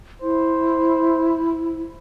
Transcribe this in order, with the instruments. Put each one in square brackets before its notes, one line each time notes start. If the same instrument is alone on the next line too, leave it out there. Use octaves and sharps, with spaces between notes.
[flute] E4 [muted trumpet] C5